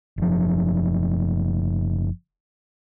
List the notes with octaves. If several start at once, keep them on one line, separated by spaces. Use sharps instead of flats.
F#1 F3